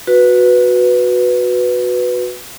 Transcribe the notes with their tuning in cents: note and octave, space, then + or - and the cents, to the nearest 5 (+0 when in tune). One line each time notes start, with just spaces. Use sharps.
F#4 -15 B4 +0